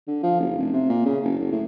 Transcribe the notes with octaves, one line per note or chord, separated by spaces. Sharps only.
D3
F3
F#1
F1
C3
A#2
C#3
F#1
F#1
A2